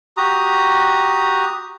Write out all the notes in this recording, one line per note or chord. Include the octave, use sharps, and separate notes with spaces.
F#4 G4 A#5 D#6